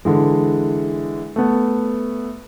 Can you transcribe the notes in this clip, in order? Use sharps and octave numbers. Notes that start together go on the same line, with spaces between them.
D3 E3 G#3
A3 B3